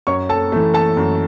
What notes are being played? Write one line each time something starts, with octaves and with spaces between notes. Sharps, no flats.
F#2 C#5 C#6
A4 A5
E3 A3
A4 A5
F#2